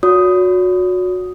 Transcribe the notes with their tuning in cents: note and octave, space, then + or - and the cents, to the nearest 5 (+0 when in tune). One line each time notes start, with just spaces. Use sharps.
F#4 -25 C#5 +45 D#6 +0